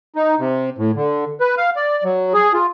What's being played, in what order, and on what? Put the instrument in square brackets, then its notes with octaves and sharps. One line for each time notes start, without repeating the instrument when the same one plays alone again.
[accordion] D#4
C3
A2
D3
B4
F5
D5
F#3
G#4
F4